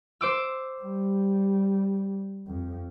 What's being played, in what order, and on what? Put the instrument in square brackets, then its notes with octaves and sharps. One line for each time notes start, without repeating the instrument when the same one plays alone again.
[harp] C5 D6 E6
[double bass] G3
F2